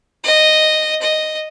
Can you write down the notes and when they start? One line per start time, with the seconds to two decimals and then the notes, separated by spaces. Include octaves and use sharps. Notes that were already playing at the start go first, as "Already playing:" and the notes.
0.24 D#5
1.02 D#5